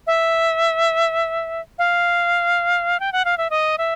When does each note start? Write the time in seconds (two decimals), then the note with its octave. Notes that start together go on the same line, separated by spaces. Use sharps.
0.07 E5
1.78 F5
3.00 G5
3.12 F#5
3.25 F5
3.38 E5
3.50 D#5
3.78 E5